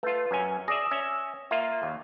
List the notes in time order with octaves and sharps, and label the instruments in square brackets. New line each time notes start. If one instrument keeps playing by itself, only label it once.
[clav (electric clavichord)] A3 F4 [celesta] B4
[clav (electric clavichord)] F#2 C#4 G#5
[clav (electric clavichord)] G#4 D5 E5 [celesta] D#6 A#6
[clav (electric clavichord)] C#4 E5
[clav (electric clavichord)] A#3 F4 [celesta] E5
[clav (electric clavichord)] D#2